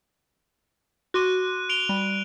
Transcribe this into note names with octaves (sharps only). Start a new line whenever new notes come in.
F#4 C6 D6 F#6 D#7
D7 F7 G7
G3